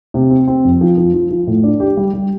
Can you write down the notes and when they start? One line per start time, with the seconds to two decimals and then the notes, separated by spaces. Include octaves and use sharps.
0.14 C3
0.30 C4
0.47 C4
0.65 F2
0.81 F3
0.98 F3
1.13 F3
1.31 F3
1.47 A2
1.63 D4
1.80 G4
1.97 G3
2.13 G3